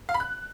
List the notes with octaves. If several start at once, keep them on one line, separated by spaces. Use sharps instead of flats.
F5
B5
F#6